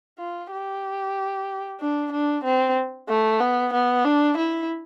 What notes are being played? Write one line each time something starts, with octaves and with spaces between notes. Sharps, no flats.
F4
G4
D4
D4
C4
A3
B3
B3
D4
E4